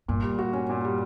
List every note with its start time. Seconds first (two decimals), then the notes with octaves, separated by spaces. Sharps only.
0.08 G2 A#2
0.23 G3
0.39 F#4
0.53 C#4
0.70 A#2
0.84 G3